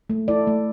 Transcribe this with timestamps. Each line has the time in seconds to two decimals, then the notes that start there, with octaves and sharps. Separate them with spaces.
0.10 A3
0.28 E4 A4 D5
0.47 A3